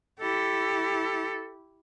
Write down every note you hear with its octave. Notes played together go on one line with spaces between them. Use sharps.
E4 G4 A4